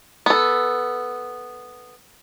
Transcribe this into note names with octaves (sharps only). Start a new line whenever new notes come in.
B3 A4